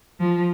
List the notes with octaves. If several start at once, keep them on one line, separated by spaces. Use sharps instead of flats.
F3